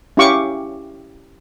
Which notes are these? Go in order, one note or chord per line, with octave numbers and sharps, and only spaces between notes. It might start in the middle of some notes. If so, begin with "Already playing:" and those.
C#4 E4 G4 F5 C#6 D6